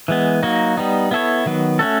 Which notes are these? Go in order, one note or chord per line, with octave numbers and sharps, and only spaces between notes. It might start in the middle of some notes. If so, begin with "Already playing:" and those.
E3 G#3 B3
F#3 A#3 D#4 F#4
G3 B3 D#4
B3 E4 A4 C#5
D#3 F#3 B3
A3 C#4 F#4 A4